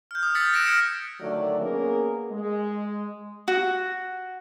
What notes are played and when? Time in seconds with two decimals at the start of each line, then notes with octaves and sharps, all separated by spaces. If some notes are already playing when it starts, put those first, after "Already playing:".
0.11 F6 G6
0.23 D#6
0.35 E6 F6 A6 B6 C#7
0.53 F#6 A#6 B6 D7 E7
0.66 D#6 F6 G#6 A#6 C#7 D7
1.20 D3 D#3 F#3 A3 D5
1.59 A#3 B3 C#4 G#4 A#4
2.30 G#3
3.48 F#4